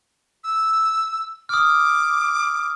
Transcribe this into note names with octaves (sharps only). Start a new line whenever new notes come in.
E6
D6 D#6 F6